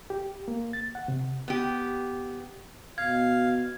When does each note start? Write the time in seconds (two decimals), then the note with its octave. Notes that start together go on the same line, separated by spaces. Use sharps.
0.10 G4
0.48 A#3
0.73 A6
0.95 F#5
1.08 C3
1.48 B3 G4
2.98 B2 F5 G#6